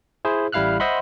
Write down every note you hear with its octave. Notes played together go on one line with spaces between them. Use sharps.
E4 G#4 C5
A1 G3 E4 F5 F6 F#6
C5 D#5 E5 F#5 B5 C6